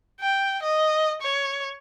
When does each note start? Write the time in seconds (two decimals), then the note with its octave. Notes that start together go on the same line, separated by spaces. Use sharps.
0.21 G5
0.63 D#5
1.22 C#5